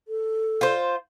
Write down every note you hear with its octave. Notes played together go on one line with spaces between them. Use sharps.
A4
F4 C5